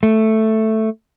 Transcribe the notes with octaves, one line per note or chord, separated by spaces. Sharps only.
A3